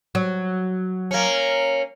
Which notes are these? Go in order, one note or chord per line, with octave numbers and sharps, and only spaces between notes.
F#3
A#3 C#4